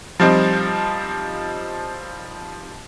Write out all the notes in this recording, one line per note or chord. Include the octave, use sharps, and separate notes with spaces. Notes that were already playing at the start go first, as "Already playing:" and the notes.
F3 G3 C4 D#4